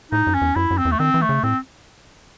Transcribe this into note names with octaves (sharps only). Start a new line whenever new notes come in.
A2 D#4
F#2
C#4
E2
F#2 E4
F#2
C4
E2
A3
D#3 C4
E3
A3
C#3
A2 C4